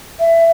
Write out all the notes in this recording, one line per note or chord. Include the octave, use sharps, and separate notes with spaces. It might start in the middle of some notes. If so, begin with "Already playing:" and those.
E5